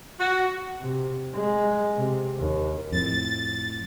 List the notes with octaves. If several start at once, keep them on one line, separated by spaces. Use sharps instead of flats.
F#4
C3
G#3
C3
D#2
F2 A2 A6